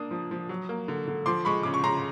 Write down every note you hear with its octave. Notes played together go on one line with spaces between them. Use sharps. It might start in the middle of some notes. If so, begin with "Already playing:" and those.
Already playing: A#3 D4 D#6
F3
F3
F#3
A#3
D3
D3
F3 C6 D6
G#3 B5 C#6
C#3 D6
C#6
C#3 A#5 C6